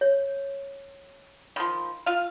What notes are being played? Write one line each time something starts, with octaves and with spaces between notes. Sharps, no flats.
C#5
D#3 F3 B5
F4 F5